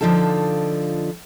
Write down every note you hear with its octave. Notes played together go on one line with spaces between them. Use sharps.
D3 F3 D#4 F4 A4